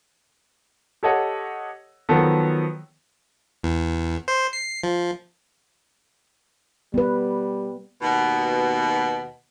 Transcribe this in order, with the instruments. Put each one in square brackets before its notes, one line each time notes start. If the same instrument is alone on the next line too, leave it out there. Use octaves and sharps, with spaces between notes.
[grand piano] G4 A4 C#5 D#5 F#5
D#3 F3 F#3 B3 A4
[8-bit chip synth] E2
C5
C7
F3
[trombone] G3 [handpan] B3 B4
[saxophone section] D#2 B2